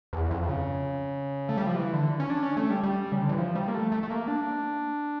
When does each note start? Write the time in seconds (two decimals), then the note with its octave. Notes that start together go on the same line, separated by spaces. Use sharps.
0.13 E2
0.31 F2
0.49 C#3
1.49 A3
1.57 G3
1.66 F3
1.76 E3
1.93 D3
2.20 C#4
2.30 D4
2.43 C#4
2.57 A3
2.70 G3
2.83 G3
3.12 C#3
3.21 D3
3.29 E3
3.38 F3
3.55 G3
3.68 A#3
3.74 A3
3.92 A3
4.03 A3
4.10 A#3
4.28 D4